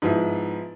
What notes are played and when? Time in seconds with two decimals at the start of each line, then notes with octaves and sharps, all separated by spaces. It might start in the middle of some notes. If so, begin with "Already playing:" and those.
0.02 G#2 F3 B3 E4